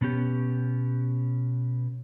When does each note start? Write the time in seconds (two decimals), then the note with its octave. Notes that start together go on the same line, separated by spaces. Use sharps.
0.01 B2 B3 C#4 G4